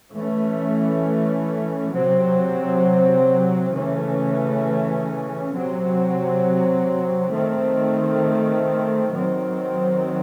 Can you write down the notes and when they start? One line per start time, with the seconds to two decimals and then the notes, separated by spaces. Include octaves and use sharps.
0.14 E3 A3 C#4
1.93 C3 F#3 C4
3.73 C#3 E3 A3 C#4
5.53 C3 F#3 C4
7.33 D#3 A3 C4
9.14 D#3 F#3 C4